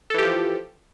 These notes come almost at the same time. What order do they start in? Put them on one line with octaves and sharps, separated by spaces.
A4 E3 G4 F3